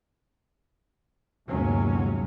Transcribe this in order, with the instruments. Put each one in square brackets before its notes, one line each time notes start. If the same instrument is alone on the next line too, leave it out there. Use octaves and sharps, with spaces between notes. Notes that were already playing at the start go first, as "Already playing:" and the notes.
[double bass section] G1 D#2 C3 F#3 G#3 C#4